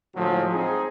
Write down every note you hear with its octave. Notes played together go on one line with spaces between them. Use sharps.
A2 D3 F3 F#3 G#3
C4 D#4 G#4